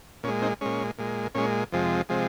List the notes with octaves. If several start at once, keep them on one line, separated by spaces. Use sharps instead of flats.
A#2 G#3 C#4
C4 D#4
A#2 G#3 C#4
A#2 G#3
A#2 G#3 C#4
F2 C3 F3 G#3
C3 F3 G#3